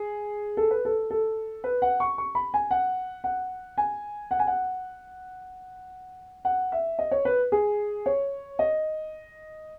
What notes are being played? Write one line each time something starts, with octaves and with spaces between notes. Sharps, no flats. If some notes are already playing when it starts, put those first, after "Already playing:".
Already playing: G#4
A4
B4
A4
A4
B4
F#5
C#6
C#6
B5
G#5
F#5
F#5
G#5
F#5
G#5
F#5
F#5
E5
D#5
C#5
B4
G#4
C#5
D#5